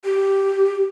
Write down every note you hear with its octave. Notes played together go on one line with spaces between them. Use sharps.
G4